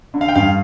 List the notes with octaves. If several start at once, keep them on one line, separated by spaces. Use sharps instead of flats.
D3
F5
G5
G2 F5